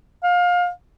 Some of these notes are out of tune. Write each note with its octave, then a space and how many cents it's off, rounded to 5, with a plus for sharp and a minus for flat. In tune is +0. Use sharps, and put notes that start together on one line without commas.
F5 +25